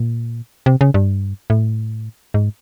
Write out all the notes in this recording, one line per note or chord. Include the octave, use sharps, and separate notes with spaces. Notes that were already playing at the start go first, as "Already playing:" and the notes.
Already playing: A#2
C3
C#3
G2
A2
G#2